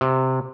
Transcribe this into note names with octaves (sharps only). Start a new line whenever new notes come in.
C3